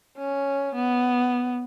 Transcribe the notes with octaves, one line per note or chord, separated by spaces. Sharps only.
C#4
B3